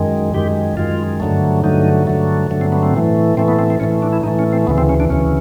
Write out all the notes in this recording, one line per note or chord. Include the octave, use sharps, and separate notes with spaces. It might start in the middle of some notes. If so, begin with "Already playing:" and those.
Already playing: F#2 D#3 G#3
F#2 D#3 G#3 G4
F#2 D#3 G#3 F4
G2 D3 F#3 A3
G2 D3 F#3 A3 D#4
G2 D3 F#3 A3
G2 D3 F#3 A3
C4
B3
C4
A2 E3 A3
A2 E3 A3 C4
B3
C4
C4
A2 E3 A3 C#4
D4
E4
A2 E3 A3 D#4
C#4
C4
D2 C#3 E3 B3
C4
C#4
D4
D2 C#3 E3 C#4